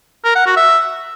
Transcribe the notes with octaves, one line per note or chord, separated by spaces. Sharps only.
A#4
F#5
F#4
E5